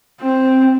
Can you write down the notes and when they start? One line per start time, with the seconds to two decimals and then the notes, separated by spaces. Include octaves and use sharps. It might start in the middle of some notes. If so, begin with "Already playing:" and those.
0.20 C4